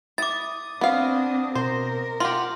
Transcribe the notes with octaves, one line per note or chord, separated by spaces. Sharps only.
E4 D6 D#6 A6
B3 C4 D4 F5
B2 A#4 C5
F4 G4 F#5 C6